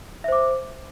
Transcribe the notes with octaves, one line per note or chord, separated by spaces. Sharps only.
C5 E5 D6